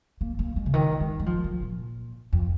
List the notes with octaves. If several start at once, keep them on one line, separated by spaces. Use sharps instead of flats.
A#3
A#3
G#3
C#3
D#3
G#3
G#3
F3
D#3
A#2
F2